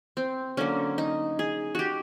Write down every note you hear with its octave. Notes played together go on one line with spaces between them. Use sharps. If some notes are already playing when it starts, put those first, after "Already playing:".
C4
D3 F#3 A#3 C#4
D#4
G#4
F#4 G4